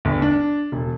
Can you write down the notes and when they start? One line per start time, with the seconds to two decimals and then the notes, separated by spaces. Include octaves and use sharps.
0.05 G1
0.22 D4
0.72 E1